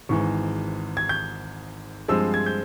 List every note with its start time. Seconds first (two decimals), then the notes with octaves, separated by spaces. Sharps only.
0.09 G#1 G#2 E3 C#6
0.97 G#6
1.09 G6
2.08 G2 F3 G#3 C4 E6
2.34 G#6
2.46 G6